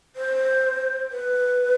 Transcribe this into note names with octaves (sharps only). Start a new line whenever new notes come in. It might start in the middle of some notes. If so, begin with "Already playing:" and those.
C5
B4